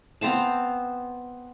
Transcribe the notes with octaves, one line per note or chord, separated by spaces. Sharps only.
B3 C4 F5 A5